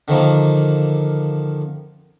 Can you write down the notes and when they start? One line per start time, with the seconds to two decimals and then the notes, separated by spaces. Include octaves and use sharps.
0.08 D3 D#3 F3 A#3